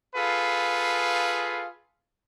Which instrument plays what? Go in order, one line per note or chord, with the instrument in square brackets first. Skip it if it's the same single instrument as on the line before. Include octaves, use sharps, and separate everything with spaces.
[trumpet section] F4 G#4 A4 B4 F5